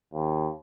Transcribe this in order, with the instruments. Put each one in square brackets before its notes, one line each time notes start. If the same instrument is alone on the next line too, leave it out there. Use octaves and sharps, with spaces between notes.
[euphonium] D#2